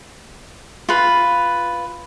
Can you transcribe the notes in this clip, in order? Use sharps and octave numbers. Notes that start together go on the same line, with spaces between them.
F4 B4